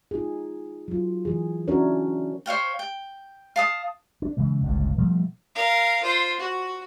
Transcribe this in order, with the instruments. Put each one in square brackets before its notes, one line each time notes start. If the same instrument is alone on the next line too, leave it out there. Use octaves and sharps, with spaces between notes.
[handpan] D#4 F4 G#4
F#3 F4
E3 G#4
C#4 D4 E4 F#4 A#4 C#5
[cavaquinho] C5 C#5 F5 G5
G5
F5 A5 D#6
[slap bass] D4
C#3 E3 G#3
G1 C#2 G2 A#2
B2 F3 G3 A3
[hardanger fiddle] A#4 F5
F4 C5
F#4